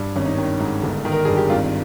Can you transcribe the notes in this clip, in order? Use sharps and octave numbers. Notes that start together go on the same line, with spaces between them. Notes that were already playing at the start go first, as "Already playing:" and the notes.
Already playing: G2
G#1 C#4
D#4
D#3 C#4
G#2
G1
D#3
A#4
G2 G#4
G4
G#1 F4